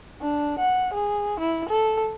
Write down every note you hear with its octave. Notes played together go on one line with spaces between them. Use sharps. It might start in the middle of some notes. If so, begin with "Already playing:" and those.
D4
F#5
G#4
E4
A4